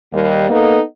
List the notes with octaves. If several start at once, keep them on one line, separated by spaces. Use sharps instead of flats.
D#2 G3
A#3 B3 D#4 A4